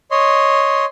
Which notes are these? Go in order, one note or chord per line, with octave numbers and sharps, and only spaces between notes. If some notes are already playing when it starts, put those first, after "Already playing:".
C#5 D#5 C6